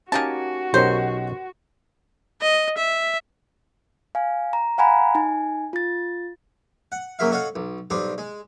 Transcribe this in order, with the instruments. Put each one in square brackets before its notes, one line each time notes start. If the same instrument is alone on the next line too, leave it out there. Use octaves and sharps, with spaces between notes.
[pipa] A#3 D#4 A5 [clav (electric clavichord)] C#4 G4 G#5 [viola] F#4
[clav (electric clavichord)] B1 C#4 D#4 [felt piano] G4 A#4 C#5 [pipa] C5
[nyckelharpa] D#5
E5
[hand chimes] F5 G#5
A#5
F5 F#5 G#5 A#5 B5
D#4 G#5
F4 A6
[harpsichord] F#5
F#2 C#3 F#3 A#3 E5 F5
F#4 A4 C#5 D#5 F5 F#5
B1
B1 G3 C4 D4 D#5
G#3